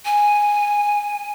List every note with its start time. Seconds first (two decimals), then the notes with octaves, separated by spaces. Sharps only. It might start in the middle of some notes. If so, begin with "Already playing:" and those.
0.05 G#5